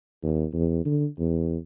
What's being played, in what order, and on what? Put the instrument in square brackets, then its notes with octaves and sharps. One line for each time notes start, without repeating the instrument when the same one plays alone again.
[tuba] D#2
E2
D3
E2